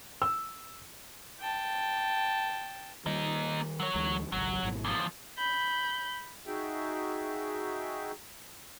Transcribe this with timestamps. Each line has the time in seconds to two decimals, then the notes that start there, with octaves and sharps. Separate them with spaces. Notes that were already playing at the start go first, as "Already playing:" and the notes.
0.22 E6
1.41 G5 A5
3.06 D#3 G3 A#3 D#5
3.80 F#3 C#5
3.95 D2 E3 G#3
4.32 G#1 C#2 F#3
4.63 G#1 G#2 B2
4.85 E2 F3
5.37 B5 G6
6.47 D#4 F#4 G#4 E5 G5